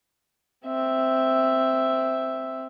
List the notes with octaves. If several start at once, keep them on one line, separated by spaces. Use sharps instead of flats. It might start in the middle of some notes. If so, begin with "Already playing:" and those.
C4 E5